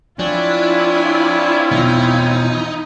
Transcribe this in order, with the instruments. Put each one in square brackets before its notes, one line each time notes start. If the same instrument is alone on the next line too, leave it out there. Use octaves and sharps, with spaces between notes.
[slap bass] F3 [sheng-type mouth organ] C4 C#5 G#5 [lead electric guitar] D4 [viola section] E4 F4
[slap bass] B2 E3 F3 [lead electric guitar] D#4